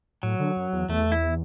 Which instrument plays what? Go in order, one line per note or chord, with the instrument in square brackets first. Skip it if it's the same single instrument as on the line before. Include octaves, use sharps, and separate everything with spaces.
[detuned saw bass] A2 [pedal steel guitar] F#3
[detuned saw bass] D3
F#2
E2
[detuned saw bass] E2 [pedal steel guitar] A3
[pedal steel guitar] E4